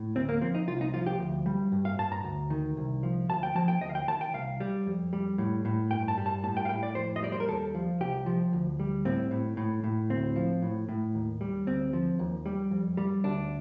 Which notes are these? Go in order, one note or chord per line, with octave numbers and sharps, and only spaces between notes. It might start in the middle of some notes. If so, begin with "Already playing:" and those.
Already playing: A2
D2 C4
A#3
F3 C4
D#4
C2 F4
D#4
F3 F4
G4
D2
G3
G2
F5
G2 A5
A#5
D2
D#3
C2
F3
D2 A5
G5
F3 A5
G5
D2 D#5
F5
G5
D#3 A5
G5
C2 F5
G3
F2
G3
A2
A2
G2 G5
A5
G3
A5
A2 A5
G5
F5
A2 G5
D5
F2 C5
D#5
G3 D5
C5
A#4
D#2 A4
F3
C2 G4
F3
D2
G3
A2 C4
A2
A2
A2
D2 C4
F3
A2
A2
D#2
G3
D2 C4
F3
D#2
G3
F2
G3
D2 D4